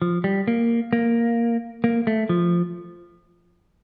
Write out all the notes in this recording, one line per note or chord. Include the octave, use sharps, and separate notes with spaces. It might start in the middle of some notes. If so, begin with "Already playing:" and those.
F3
G3
A#3
A#3
A#3
A3
F3